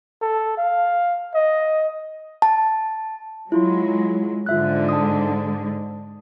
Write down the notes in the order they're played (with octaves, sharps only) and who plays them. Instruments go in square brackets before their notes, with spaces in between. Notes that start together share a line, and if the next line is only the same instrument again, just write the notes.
[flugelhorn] A4
F5
D#5
[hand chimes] A5
[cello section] F#3 G#3 [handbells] E4 F4 C6
[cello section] G#2 D3 [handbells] F4 E5 F#6
[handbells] A5 D#6